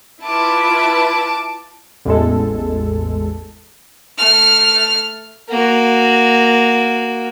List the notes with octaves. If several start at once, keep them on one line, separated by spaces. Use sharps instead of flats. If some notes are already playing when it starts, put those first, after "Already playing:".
E4 F4 B4 A5 D6
A1 E2 G#3 A4
A3 F6
A#3 F#4